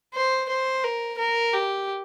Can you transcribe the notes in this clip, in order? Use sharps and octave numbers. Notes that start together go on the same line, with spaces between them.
C5
C5
A#4
A#4
G4